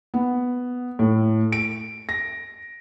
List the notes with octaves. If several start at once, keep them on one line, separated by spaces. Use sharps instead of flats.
B3
A2
D7
A#6